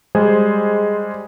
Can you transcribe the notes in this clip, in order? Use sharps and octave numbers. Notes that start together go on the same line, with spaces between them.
G3 G#3 G#4 C5